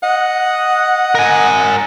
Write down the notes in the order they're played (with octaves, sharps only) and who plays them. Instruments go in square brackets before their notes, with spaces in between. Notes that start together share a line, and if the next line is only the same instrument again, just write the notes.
[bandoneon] D#5 D#6 [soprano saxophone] F#5
[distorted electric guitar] A#4 G#5